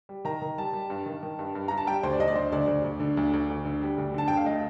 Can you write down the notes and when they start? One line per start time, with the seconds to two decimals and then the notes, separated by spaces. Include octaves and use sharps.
0.09 G3
0.25 D#3 A#5
0.42 D#3
0.58 G3 A5
0.73 G3
0.90 G2
1.06 D#3
1.23 D#3
1.39 G2
1.55 G2
1.68 G2 A#5
1.77 A5
1.87 G3 G5
2.03 D2 C5
2.13 D5
2.19 D2 D#5
2.28 D5
2.35 D3 C5
2.52 D2 D5
2.68 D2
2.84 D2
3.00 D3
3.17 D2
3.33 D2
3.50 D2
3.65 D3
3.82 G3
3.98 D2
4.14 D3 A5
4.28 D2 G5
4.37 F5
4.46 A3 D#5